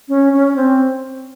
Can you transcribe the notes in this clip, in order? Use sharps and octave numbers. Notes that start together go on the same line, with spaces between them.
C#4
C#4
C4